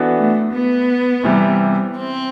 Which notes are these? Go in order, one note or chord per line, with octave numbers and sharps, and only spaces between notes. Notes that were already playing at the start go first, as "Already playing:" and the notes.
Already playing: E3 B3 D4 F#4 A4
A3
B3
C3 E3 G3
C4